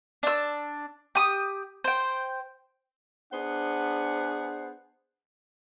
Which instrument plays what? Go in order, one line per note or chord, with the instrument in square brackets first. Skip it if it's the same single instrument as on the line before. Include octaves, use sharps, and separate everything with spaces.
[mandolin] D4 E6
G4 D#6
C5 G5
[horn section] B3 D4 G#4 C5 F#5